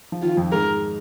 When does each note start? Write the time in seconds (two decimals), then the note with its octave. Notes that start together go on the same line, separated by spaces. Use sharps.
0.12 F3
0.22 D#3 F4
0.37 F2 F3
0.52 G#2 G#3 A#4